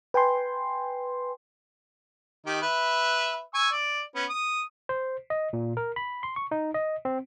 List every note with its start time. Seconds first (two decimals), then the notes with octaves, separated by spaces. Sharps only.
0.14 B4 G5 G#5 C6
2.46 D#3 D#4 G4
2.62 B4 E5
3.54 G#5 C#6 E6
3.72 D5
4.15 B3 C#4
4.29 D#6
4.89 C5
5.30 D#5
5.53 A#2
5.77 A#4
5.96 B5
6.23 C6
6.36 C#6
6.51 D#4
6.74 D#5
7.05 C4